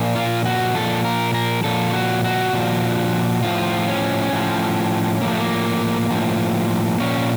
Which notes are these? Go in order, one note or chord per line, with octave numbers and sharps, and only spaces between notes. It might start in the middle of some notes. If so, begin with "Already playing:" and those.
Already playing: A#2 F3
F4
F#4
A#2 F3 A4
A#4
A#4
A#2 F3 A4
F4
F#4
F#4
A#2 F3
A2 F3 F4
C#4
A2 F3
A2 F3 A#3
A3
A#3
A2 F3
A#2 F3 C#4